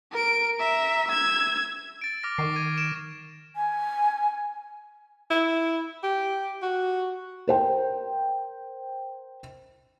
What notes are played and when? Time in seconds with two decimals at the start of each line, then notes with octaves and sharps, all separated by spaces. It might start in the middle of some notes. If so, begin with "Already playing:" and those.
0.12 A#4 D7
0.59 E5 A#5
1.08 E6 G#6
2.01 A6 D7
2.23 D6 F6 A#6
2.38 D#3 C#6 C7
2.56 G#6 D#7
2.77 D7 E7
3.56 G#5
5.30 E4
6.03 G4
6.62 F#4
7.47 A#4 C5 G5